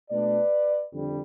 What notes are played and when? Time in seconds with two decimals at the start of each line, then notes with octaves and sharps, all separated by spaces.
0.11 B2 A3 D4 B4 D5
0.93 F2 D3 G3